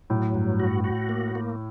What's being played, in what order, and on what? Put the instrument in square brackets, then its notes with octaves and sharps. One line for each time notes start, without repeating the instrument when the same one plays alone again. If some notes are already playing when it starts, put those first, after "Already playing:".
[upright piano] A2 [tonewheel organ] F#3
[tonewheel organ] G2
F#4
F#4
A#3
A#3